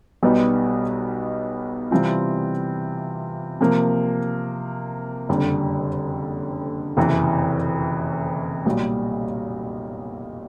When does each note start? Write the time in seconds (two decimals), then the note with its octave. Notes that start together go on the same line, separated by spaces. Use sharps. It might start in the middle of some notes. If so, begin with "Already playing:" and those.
0.23 B1 B2 G3 B3 D#4
1.91 C3 E3 G3 C4 F4
3.61 C3 F3 A#3
5.29 F#1 F2 D3 G3
6.97 F#1 F2 C3 E3
8.66 B1 A#2 G3